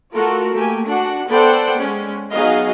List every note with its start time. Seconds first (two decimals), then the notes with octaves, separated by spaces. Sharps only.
0.14 A3 F4 F#4 A4 A#4
0.54 A3 A#3 G4 G#5
0.88 D4 F#4 F#5
1.29 B3 A4 C5 D5 F#5 G5
1.78 G#3 C#4
2.31 F#3 B3 D#4 G#4 D#5 F5